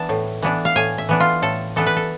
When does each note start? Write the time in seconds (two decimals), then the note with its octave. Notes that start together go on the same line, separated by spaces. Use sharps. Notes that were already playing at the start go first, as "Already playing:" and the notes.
Already playing: E3 B3 D4 A5
0.09 A2
0.42 E3 B3 D4
0.65 F5
0.76 A2 G#5
0.98 E5
1.09 E3 B3 D4
1.20 F4
1.42 A2 A4
1.76 E3 B3 D4 A4
1.86 B4
1.96 A4